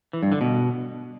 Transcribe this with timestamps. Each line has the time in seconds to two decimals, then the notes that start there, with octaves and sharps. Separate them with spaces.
0.13 E3
0.23 G2
0.32 D3
0.41 B2